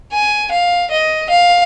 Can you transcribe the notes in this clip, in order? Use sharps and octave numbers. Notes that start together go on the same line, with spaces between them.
G#5
F5
D#5
F5